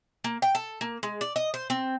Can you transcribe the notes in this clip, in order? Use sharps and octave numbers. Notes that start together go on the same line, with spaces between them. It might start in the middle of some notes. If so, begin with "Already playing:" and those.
A#3
G5
A4
A#3
G#3
D5
D#5
C5
C4